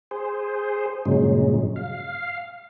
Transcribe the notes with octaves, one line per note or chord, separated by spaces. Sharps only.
G#4 C5
G2 A#2 C#3 F#3 G#3
F5